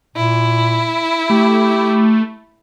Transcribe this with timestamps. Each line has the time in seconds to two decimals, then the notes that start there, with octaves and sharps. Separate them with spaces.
0.16 A#2 E4
1.30 A3 G4